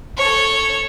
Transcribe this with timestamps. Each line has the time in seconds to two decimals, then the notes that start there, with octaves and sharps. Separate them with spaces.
0.17 A4 C#5